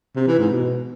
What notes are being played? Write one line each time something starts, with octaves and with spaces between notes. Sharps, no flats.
C3
E3
G#2
B2